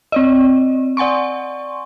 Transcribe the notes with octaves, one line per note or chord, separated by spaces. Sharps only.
C4 D5 D#5
D5 F#5 G#5 C6 C#6